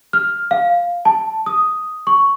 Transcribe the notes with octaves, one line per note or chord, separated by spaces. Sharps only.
F6
F5
A5
D#6
C#6